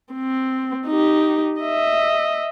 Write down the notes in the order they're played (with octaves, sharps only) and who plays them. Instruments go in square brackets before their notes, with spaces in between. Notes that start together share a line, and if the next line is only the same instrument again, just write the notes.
[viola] C4
D#4 G4
D#5 E5